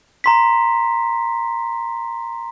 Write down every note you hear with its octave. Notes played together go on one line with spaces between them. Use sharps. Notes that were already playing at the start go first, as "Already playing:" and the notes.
A#5 C6 B6